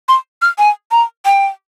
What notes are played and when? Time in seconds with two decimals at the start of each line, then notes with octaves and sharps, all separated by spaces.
0.09 C6
0.42 F6
0.58 G#5
0.91 A#5
1.25 G5